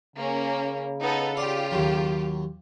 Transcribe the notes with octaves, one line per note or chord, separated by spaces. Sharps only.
C#3 A#3 C#4
B3 D#4 A4
F4 G4 D5
D#2 F#3